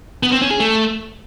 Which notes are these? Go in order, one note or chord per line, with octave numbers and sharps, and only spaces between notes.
B3
C4
C#4
G#4
A3